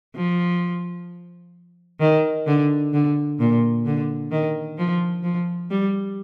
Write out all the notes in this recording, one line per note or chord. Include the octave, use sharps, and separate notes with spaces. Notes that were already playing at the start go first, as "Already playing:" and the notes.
F3
D#3
D3
D3
A#2
D3
D#3
F3
F3
G3